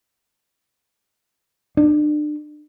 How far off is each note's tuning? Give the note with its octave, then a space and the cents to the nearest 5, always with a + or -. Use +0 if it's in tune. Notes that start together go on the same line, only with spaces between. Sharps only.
D4 +35